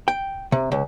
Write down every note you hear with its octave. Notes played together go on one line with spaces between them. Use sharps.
G5
C3
C#2